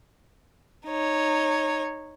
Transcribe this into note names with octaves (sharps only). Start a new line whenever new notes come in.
D#4 C#5